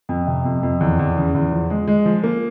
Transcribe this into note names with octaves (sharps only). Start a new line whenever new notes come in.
F2
C3
F2
F2
E2
E2
C#3
E2
F3
G#3
G#3
F3
A#3